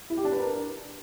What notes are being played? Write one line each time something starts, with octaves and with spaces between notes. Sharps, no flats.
E4
G4
D4
B4
A#4